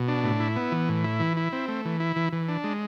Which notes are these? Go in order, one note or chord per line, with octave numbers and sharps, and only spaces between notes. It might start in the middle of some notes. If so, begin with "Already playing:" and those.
Already playing: B2
D4
A2
E4
B3
E3
A2
E4
E3
E4
C4
A3
E3
E4
E3
E3
D4
G#3